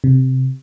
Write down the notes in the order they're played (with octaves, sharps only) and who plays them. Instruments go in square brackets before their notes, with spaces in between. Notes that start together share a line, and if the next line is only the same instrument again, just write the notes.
[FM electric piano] C3